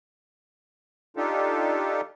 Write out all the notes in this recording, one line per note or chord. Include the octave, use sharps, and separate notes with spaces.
D4 D#4 F4 G4 A4